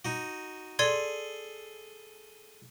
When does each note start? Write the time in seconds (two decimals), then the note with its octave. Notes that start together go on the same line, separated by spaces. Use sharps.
0.05 D#4 F#4
0.79 G#4 A4 D5 C6 G#6